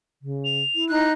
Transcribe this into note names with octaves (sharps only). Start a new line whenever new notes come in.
C#3
F7
E4
D#4 F#6